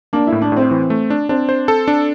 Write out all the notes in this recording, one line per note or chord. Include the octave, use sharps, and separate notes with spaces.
A#3 D4
E4
A2
D4
A2 C4
E3
A3
D4
C4 D4
C5
A4
D4